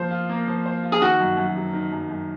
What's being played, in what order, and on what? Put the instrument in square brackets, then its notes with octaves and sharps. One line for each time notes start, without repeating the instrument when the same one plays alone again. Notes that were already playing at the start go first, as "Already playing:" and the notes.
Already playing: [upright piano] F3 A#3 C5
F4
A#3
F3
C5
F4
[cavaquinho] G#4
[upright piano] D#3 [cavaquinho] F#4
[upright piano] F#2
F#2
F#3
D#3
F#2
F#2